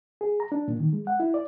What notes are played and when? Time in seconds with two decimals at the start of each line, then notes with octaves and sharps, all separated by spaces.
0.21 G#4
0.40 A#5
0.52 D4
0.68 A#2
0.80 D#3
0.93 G#3
1.07 F#5
1.20 E4
1.34 D5